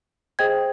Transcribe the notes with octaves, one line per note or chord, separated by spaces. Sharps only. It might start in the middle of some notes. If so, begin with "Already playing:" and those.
G#4 C5 D#5 G5 G#6